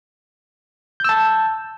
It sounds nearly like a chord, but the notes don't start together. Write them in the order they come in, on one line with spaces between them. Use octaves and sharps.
G6 E6 A5